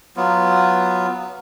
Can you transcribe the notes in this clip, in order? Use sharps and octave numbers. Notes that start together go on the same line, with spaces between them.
F#3 B3 F4